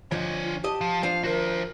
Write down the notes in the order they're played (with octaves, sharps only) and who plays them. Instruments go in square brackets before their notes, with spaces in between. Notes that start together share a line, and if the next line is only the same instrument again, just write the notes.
[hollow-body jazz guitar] D3 F3 [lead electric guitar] D4 C#5 [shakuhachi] D#5
[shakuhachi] F4
[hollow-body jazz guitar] G4 D#5 [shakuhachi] A5
[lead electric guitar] F3
[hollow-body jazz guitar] F3 D4 [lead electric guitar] F5
[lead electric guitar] F#4 C5 [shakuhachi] A#4